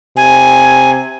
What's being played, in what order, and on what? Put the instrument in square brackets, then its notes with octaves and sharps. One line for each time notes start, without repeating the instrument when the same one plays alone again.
[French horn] C3 [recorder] G#5